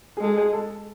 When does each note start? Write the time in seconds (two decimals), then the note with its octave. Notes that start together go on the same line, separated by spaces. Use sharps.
0.17 G#4
0.21 G#3 A4
0.37 G#4
0.53 A4